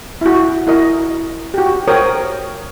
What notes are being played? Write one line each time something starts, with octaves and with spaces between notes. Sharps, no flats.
E4 F#4
E4 F#4 A#4 D#5
F#4 G4
F#4 A#4 C5 C#5 G5 D#6